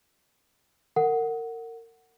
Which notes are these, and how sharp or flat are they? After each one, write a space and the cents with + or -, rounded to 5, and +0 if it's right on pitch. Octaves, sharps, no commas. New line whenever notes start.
A#4 -30 F#5 +0